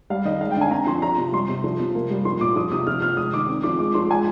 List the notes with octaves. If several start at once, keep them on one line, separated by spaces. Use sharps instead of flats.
G3 F5
D#3 D#5
G#3 F5
G5
D3
G#5
C4 A#5
F3 C6
F3 A#5
C3
G3 C6
C3
F3
C3
A#3
G3
F3 C6
A#2 D6
F3 D#6
C3 D#6
F3 F6
C3 F6
G#3 D#6
D#3 D6
C4
F3 D6
G#3 D6
F3 C6
G#3 G#5